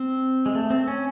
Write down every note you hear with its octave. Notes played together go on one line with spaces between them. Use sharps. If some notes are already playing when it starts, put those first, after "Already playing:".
Already playing: C4
G#3
A3
C4
C#4